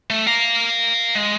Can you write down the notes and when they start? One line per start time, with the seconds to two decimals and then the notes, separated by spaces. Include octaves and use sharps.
0.10 A3
0.27 F5 A#5
1.15 G#3